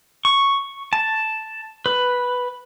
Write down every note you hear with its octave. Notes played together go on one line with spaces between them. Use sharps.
C#6
A5
B4